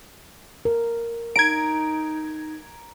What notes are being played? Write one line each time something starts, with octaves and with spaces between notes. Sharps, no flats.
A#4
D#4 A#5 G#6 D7